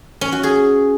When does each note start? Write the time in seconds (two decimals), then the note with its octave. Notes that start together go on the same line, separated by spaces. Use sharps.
0.21 C#4
0.32 F#4
0.43 G#4